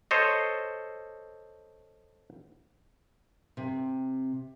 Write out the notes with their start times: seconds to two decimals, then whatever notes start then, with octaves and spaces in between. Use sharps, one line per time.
0.11 A4 C5 C#5 D#5
3.57 C3